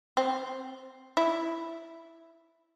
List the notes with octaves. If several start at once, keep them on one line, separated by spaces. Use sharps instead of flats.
C4
E4